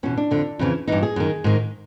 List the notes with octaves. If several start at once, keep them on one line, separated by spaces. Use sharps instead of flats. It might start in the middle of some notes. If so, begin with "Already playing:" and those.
E2 B2 C#4
D4
F2 D3
F2 C#3 E3
G2 E3 D#4
G#4
F#2 D#3
G#2 D#3